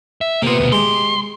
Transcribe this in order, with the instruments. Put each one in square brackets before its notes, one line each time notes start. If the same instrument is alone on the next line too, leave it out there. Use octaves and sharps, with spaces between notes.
[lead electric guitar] E5
[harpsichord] C3 B3 [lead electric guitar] A#3 F4
[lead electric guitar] D2 B2
[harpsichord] G#3 G4 [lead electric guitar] C6